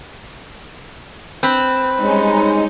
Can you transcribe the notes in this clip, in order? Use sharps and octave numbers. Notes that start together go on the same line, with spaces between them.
C4 B4
G3 G#3 C#4 D#4